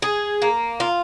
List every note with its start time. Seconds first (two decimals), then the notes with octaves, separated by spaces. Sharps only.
0.02 G#4
0.42 A#3
0.80 F4